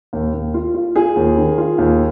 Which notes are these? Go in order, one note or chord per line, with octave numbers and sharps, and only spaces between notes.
D#2
D#2
F4
F4
F4 G#4
D#2
D#3
F4
D#2